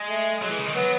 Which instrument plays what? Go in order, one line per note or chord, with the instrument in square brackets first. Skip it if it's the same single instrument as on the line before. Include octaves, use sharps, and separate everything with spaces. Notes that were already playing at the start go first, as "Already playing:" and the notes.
Already playing: [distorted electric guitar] G#3
[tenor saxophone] A3
[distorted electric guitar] F#3 [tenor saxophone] G#3
[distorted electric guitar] E3
C#3
D#3
[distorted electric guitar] F#3 [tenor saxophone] B3